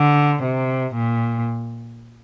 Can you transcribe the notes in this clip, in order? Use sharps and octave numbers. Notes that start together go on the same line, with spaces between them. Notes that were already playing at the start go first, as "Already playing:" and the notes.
Already playing: D3
C3
A#2